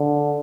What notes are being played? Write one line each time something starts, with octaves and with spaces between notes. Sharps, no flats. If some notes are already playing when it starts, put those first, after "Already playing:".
Already playing: D3